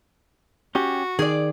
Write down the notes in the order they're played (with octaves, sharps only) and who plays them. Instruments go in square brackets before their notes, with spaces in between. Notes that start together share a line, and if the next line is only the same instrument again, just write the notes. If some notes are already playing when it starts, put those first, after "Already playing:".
[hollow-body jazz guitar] C#4 G4 [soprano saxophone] F#4
[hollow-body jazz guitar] D#3 [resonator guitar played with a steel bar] G#4 D5